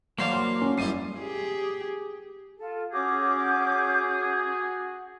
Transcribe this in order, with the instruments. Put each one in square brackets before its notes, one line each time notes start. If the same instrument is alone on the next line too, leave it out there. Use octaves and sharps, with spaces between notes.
[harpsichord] F#3 D4 [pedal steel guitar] A#3 C5 F5
[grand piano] C6
C#4
[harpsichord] F#2 G3 E4 [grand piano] C7 D#7
[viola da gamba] G4 G#4
[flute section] F4 A4
[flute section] C#4 D6 G6 [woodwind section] F#4 G#4